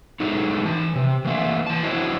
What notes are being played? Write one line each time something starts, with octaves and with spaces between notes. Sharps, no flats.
A2 F#3 G#3 A3 D#4
E3 A5
C3
E3 A3 A#3 E5
E3 A5
E4 F#4 C5 C#5 D#5